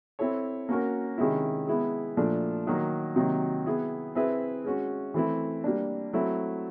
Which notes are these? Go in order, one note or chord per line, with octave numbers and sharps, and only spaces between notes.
C4 E4 A4 C#5
A#3 C#4 F#4 A#4
C3 D#3 G#3 C#4 E4
G#3 B3 E4
A#2 F3 A3 D4
D#3 F#3 A#3
C3 D#3 F#3 A#3
B3 E4 G#4
C4 E4 G#4 B4 E5
G#3 C#4 F#4
E3 A3 C4 E4
G3 A#3 D4
F#3 A3 C4 E4